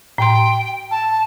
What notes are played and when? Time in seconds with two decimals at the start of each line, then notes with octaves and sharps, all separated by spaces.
0.18 A2 G5 C6
0.91 A5